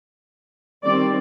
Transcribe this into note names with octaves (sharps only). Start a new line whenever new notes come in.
D#3 G3 C4 D5